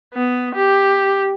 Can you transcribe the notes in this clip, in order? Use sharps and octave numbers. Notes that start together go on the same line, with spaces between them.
B3
G4